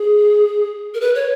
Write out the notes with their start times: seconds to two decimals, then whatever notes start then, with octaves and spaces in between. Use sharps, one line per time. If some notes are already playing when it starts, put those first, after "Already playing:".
Already playing: G#4
0.94 A#4
1.01 B4
1.15 C#5